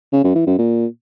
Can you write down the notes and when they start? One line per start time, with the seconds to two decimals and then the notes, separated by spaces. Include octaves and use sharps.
0.13 C#3
0.24 F#2
0.36 E3
0.47 F#2
0.59 A#2